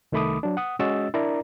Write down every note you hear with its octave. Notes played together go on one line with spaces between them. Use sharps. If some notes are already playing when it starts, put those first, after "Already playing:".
C2 D#3 A3 B5 D6 D#6
F#3 D4
F#5 D#6
G#3 C#4 F#4 D#5 E6 A6
D4 E4 A#4 D5 A#5